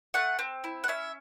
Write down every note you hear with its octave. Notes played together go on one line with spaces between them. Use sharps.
A3 F#5
C4
E4
F#5
C#4 E5